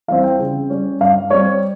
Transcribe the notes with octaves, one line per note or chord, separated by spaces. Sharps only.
E3 G3 C4 F5
G5
C#3
G3 C#4
G2 F5
G3 C4 C#5